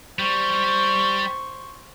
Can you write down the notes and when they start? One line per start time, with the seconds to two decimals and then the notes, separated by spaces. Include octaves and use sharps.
0.19 G3 C5 C#6